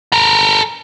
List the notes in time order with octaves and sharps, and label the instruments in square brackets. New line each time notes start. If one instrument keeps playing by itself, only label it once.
[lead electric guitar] A4 A#4